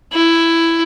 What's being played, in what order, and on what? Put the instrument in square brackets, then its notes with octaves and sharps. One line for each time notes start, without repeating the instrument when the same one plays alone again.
[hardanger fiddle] E4